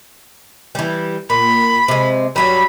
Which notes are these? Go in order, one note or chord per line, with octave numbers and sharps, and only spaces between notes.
E3 G3
A#2 B5
C3 G#3
G2 F#3 G3 B5